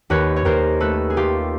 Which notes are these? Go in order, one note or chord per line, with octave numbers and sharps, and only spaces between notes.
D#2 B4 C#5
C#5
D#2 A#4 C5
A3 A4 B4
G#4
A3 F4 G4